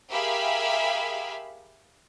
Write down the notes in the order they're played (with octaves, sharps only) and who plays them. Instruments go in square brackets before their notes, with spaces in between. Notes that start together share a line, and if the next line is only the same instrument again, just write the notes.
[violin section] G4 G#4 A#4 E5 F5 B5